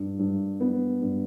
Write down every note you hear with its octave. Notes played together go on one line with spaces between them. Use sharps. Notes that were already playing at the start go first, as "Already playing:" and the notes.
Already playing: G2
G2
B3
G2